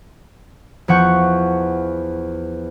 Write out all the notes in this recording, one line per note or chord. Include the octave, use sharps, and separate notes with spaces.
E2 F3 F#5 C#6 G6